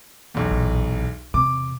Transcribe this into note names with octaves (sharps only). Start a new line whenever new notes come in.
B1 E2
A#1
E2 C3 D6